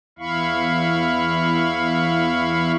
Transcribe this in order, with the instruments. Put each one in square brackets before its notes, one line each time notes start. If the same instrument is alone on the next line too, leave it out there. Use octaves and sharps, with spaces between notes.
[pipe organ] E2 E4 F5 B5 C#6